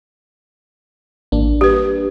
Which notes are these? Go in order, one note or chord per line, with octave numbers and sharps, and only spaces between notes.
A1 A#3 D4
G3 G4 B4